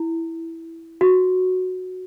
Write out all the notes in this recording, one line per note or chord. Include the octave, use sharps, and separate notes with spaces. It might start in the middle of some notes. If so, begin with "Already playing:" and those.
Already playing: E4
F#4